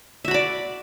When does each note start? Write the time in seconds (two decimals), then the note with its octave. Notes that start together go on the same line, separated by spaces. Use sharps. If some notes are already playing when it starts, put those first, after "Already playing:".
0.25 E5
0.28 F#4
0.31 B5
0.34 D5